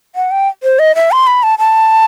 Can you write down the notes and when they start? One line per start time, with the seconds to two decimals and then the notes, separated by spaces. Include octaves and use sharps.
0.15 F#5
0.31 G5
0.63 C5
0.79 D#5
0.95 E5
1.12 C6
1.27 B5
1.43 A5
1.59 A5